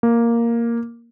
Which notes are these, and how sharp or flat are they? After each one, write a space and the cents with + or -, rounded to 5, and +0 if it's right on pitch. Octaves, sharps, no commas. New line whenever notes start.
A#3 +0